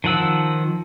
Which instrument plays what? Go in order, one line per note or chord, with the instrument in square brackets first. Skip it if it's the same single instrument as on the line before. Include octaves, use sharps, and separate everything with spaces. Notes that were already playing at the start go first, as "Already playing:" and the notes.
[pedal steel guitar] D#3 F3 F#5 E6